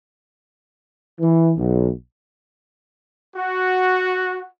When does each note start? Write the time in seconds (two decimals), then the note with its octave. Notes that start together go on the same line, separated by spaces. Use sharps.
1.20 E3
1.57 B1
3.36 F#4